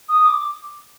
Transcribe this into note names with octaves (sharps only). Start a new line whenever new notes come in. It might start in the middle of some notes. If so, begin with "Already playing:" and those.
D#6
D6